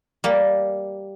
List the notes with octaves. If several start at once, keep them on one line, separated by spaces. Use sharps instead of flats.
G3 A#3